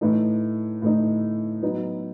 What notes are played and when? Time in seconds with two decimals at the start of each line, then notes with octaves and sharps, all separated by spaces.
0.01 A2 E3 A3 D#4
0.82 A2 E3 A3 D#4
1.63 F#3 B3 D#4